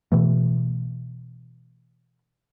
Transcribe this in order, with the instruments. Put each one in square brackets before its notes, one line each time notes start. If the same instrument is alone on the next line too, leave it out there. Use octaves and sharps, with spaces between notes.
[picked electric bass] B2 E3 A3